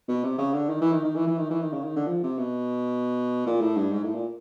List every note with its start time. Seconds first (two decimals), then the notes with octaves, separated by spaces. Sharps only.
0.08 B2
0.24 C3
0.38 C#3
0.54 D3
0.69 D#3
0.81 E3
0.93 D#3
1.04 D#3
1.16 E3
1.27 E3
1.38 D#3
1.50 E3
1.62 D#3
1.73 C#3
1.84 D#3
1.96 D3
2.08 F3
2.23 C3
2.38 B2
3.47 A#2
3.61 A2
3.77 G2
3.92 G#2
4.04 A2
4.14 A#2